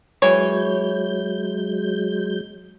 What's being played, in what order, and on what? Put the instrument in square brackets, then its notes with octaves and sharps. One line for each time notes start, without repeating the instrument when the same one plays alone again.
[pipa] E3 C#5 [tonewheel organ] F#3 G#3 G6